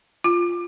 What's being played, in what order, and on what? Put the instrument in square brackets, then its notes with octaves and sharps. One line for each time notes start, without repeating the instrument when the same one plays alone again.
[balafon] F4